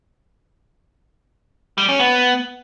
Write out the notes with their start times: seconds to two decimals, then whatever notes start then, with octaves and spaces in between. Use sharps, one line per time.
1.78 G3
1.89 C#4
2.00 B3